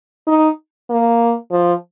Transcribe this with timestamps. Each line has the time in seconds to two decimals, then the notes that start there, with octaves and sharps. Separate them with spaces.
0.27 D#4
0.90 A#3
1.52 F3